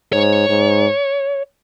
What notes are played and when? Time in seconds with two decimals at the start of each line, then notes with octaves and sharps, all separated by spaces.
0.13 G#2 C#5
0.49 G#2